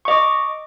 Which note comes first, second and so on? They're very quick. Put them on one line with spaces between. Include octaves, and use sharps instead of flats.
C#6 D#5 D6